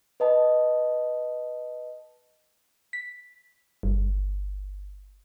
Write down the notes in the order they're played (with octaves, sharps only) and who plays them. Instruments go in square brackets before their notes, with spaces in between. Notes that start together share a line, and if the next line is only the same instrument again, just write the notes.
[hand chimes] B4 D#5 A5
[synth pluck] B6
G1